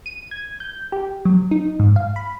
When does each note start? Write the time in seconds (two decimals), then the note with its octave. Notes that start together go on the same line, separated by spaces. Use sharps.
0.06 D#7
0.31 G#6
0.60 G6
0.92 G4
1.25 F#3
1.51 D#4
1.80 G#2
1.96 F5
2.16 B5